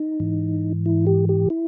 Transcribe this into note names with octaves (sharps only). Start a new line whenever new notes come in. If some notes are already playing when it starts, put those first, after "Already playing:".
Already playing: D#4
G#2 E3
E4
G4
G4
E4